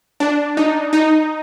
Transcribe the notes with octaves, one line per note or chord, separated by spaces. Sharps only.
D4
D#4
D#4